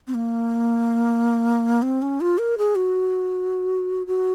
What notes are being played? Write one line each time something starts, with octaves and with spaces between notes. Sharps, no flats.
C4
A#3
C4
C#4
F4
A#4
G#4
F#4
F#4